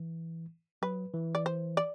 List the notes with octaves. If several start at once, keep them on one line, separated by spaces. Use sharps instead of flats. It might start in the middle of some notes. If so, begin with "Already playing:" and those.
Already playing: E3
F#3 B4
E3
D5
C5
D5